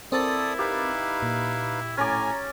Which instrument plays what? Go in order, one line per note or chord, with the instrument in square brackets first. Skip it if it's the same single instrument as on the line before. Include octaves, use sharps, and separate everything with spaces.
[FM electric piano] C4 A#4 A6 [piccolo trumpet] E4 [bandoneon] A4 D5 D#6
[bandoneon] D#4 B4 F5 [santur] G4
[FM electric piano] A#2
[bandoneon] A2 G#5 [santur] C#4 D5 [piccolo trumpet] A#5